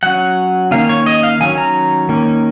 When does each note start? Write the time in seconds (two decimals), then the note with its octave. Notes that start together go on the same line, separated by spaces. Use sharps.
0.03 F#3 C#4 F#5
0.71 D#3 A#3 C#4 F5
0.89 C#5
1.06 D#5
1.23 F5
1.40 D#3 F#3 C#4 G#5
1.58 A#5
2.09 D#3 A#3 C#4